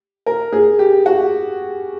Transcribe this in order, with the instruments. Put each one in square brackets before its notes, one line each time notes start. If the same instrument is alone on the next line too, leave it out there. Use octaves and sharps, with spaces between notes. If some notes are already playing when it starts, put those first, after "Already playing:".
[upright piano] A#4
G#4
G4
F#4